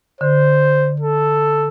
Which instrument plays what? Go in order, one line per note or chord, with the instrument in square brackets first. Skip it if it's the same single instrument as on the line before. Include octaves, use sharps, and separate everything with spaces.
[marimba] D3 [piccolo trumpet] C5
[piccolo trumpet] A4